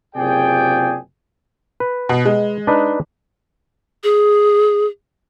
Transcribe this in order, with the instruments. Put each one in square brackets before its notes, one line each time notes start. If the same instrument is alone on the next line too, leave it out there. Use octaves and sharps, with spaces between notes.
[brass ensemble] F#1 C3 F4 G#4 D5 G5
[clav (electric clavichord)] B4
[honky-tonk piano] B2
G#3
[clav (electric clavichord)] D4 D#4 B4
[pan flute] G#4